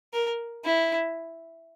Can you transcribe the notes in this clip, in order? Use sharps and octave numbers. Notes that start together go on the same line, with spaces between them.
A#4
E4